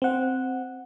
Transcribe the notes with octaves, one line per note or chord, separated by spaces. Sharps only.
C4 F#5